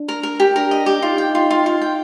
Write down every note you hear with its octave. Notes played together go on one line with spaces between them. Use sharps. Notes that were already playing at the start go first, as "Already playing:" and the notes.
Already playing: D4
A#4
A#4
G4
D4 A#4
D#5
G4
D#4 F4
G5
F4
F4
F4
G5